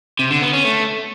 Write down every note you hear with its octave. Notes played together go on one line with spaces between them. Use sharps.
C3
D3
B3
C#4
A3